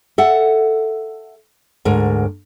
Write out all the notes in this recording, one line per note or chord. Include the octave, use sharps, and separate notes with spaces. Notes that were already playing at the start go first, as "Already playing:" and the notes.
A4 E5 F#5
D2 G#2 A#4